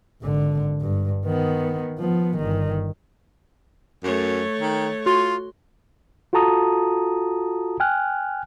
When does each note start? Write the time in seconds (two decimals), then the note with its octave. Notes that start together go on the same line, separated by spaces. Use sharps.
0.22 G#1 D3
0.81 G2
1.26 D#3 B3
1.98 F3 B3
2.37 G1 D#3
4.03 F#2 A3 C#5
4.60 D#3
5.06 F4 F#4 C6
6.33 F4 F#4 A4 A5 A#5 D#6
7.80 G5 G#5 F6 F#6